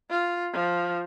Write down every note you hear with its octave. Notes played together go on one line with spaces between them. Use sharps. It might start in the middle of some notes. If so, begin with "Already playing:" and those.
F4
F3